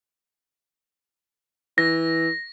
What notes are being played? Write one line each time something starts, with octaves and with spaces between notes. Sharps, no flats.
E3 A#6